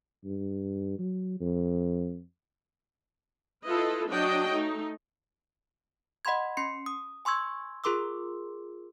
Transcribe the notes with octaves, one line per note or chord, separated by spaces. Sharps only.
G2
F#3
F2
E4 F4 A4 B4 D#5
F#3 D4 F#4 C#5 D#5 G5
A3 D#4
D#5 F#5 B5 C6 G#6
C#4 C6 C7 C#7
D#6
G#5 C6 C#6 E6 G#6
F4 G#4 A#4 C6 D6 E6